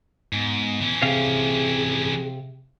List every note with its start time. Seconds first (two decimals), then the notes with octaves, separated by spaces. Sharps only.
0.33 G#2 B3
0.82 E3 C#4
1.02 C3 G#4 F5